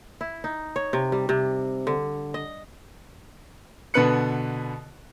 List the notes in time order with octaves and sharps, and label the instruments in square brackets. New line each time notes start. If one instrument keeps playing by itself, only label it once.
[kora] E4
D#4
C#5
C3
G3
C3
D3
D#5
[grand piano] B2 D3 B3 B4 F#6 C#7